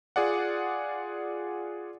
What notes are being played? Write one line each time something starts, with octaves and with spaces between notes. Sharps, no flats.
F4 G#4 D5 F#5